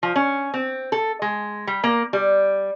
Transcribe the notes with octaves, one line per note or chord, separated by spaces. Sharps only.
F3
C#4
C4
A4
G#3
G3
A#3
G3